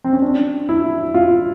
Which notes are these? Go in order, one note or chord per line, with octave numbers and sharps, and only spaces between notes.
C4
C#4
D4
E4
F4